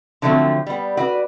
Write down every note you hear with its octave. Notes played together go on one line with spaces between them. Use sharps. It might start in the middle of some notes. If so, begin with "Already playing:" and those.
D3 F3 F#3 A3 C4
G3 B3
F#4 B4 D5